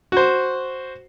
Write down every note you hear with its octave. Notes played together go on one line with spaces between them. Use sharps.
F#4 C5